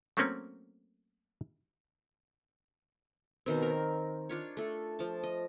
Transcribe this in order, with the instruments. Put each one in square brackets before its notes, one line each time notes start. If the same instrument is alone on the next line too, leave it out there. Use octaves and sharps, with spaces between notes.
[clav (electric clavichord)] F#3 A3 A#3 C4 C#4
[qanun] B2 D#3 C4
A#4
D4 F4 C#5
A3 A4
F3 A5
D#5